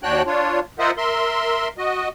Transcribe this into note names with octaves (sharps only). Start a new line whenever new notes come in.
D#2 D4 F#4 C#5 G5 F#6
D4 F4 C#5
F4 A#4 C5 D#5 E5 F#5
A#4 E5 C6
F#4 D#5